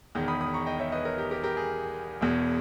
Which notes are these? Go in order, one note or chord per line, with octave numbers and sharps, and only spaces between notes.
E1 E2 D#3
B5 D#6
B5 D#6
A#5 C#6
D#5 G5
C#5 E5
B4 D#5
A#4 C#5
G4 A#4
G4 A#4
G4 A#4
G#4
E1 E2 B2